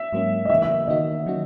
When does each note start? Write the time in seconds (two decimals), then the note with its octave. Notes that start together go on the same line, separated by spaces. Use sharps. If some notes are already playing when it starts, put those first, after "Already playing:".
Already playing: E5
0.13 G#2 F#3 A#3 C#4
0.45 D#5
0.50 C#3 E3 A#3 E5
0.62 E5
0.88 D#3 A#3 D#4 F#4 D#5
1.26 D#3 F#3 C#4 F#4